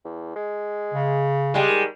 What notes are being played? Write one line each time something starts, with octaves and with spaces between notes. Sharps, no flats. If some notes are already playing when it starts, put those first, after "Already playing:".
E2
G#3
C#3
G3 G#3
D#3